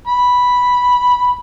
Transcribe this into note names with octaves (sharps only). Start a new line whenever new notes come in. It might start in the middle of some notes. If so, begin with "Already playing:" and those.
B5